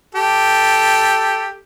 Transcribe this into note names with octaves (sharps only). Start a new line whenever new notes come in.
G4 A4